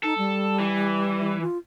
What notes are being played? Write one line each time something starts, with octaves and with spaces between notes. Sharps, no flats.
D#4 A4
G3
E3
F4